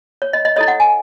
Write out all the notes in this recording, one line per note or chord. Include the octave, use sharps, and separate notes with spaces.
C#5
D#5
D#5
E4 A4 C#5 D#5
F#5
G#5